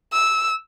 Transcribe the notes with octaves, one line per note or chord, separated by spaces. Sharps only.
E6